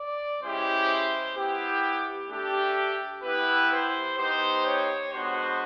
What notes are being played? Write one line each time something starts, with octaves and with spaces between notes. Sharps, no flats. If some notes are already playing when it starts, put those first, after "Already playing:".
Already playing: D5
G#3 C#4 E4 G4 C5
C5
B3 E4 G4
A3 D4 G4
B3 E4 G4 B4
C5
B3 D#4 G4 C5
C#5
G#3 B3 D4 F#4 C5